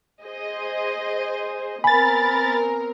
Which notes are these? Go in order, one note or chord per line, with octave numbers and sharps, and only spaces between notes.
G#4 C5 D#5
B3 C4 A#4 G#5 B5 A6